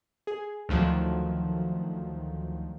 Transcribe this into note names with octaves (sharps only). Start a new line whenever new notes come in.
G#4
D2 D#3 F3 F#3